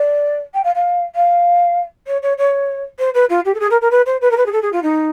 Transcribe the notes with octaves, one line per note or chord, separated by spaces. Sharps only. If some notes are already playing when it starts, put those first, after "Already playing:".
Already playing: D5
G5
F5
F5
F5
C#5
C#5
C#5
C5
B4
F4
G4
A4
G#4
A#4
A#4
B4
C5
B4
A#4
B4
G#4
A4
G#4
F4
D#4